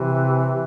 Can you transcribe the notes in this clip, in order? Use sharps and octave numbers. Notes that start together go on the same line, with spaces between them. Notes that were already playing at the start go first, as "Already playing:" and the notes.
Already playing: C3 E3